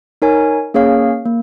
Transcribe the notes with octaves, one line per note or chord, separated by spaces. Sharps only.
D#4 A#4 C#5 G#5
A#3 C#4 G#4 C#5 F5
A#3